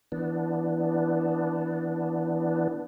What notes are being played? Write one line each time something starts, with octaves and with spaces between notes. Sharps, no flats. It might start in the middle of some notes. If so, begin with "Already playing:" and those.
E3 B3 D4